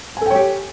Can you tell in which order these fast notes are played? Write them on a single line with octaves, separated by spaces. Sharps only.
G#5 A4 G5 C#5 G4